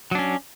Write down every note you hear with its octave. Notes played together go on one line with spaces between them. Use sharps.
F#3 C#4 D4